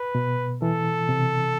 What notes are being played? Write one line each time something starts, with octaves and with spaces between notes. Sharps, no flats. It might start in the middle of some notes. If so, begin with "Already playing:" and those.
Already playing: B4
B2
E3 A4
C3